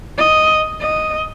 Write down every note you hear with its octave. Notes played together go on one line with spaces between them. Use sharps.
D#5
D#5